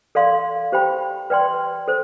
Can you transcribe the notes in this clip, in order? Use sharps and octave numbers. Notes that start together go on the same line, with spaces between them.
A4 D5 F5 C6
G4 C5 G5 B5
B4 D5 G5 C6
A4 C5